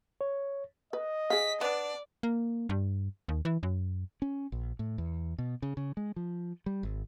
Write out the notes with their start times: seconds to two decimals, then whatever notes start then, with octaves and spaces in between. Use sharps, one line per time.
0.21 C#5
0.93 B4 D#5
1.30 G#4 F5 B6
1.61 B3 D4 D5
2.23 A#3
2.69 G2
3.28 D#2
3.45 E3
3.63 F#2
4.22 C#4
4.52 A#1
4.79 A2
4.98 E2
5.38 B2
5.62 C#3
5.77 C#3
5.97 G#3
6.16 F3
6.66 G3
6.83 G#1